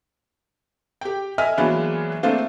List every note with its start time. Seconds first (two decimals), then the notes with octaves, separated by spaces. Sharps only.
1.01 G4 G5
1.38 D#5 E5 G#5 F6
1.58 E3 F#3 G#3 A#3 B3 D4
2.23 A3 A#3 C4 D4 F4